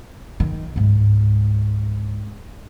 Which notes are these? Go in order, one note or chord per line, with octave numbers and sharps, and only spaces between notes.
D#3
C#2 G#2